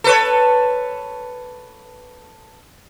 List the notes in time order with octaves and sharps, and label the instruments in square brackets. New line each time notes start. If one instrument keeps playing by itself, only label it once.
[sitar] A4 B4 C#5